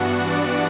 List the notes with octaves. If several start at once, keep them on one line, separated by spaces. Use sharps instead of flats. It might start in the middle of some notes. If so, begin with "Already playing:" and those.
Already playing: G2 E3 B3 D4 F#4 F#5
D4 D5